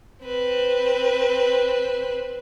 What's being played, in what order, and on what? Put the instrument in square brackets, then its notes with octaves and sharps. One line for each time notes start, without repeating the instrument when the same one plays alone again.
[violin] C4 B4